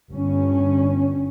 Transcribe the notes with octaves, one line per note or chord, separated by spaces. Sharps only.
G1 G2 C#4